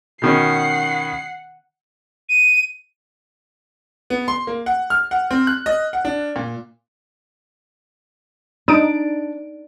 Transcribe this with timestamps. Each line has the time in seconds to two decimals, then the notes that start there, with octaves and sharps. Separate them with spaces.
0.22 B2 D#3 C#4 F#5 C7
2.29 D#7
4.10 B3
4.28 C6
4.47 A#3
4.66 F#5
4.90 F6
5.11 F#5
5.30 C4
5.47 F#6
5.66 D#5
5.93 F#5
6.05 D4
6.36 A#2
8.68 D4 D#4 D7